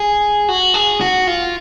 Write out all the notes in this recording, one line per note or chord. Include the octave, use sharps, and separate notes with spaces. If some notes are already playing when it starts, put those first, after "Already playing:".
Already playing: G#4
F#4
G#4
F#4
F4